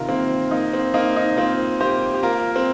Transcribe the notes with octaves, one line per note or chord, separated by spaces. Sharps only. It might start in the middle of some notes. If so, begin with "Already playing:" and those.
Already playing: C3 D#3 F4 A#4
A#3 C4
A#3 D#4
C4
A#3 D#4
D#4
A#3 C4 F4
A#3 G4 C5
G4
A#3 F4 A#4
C4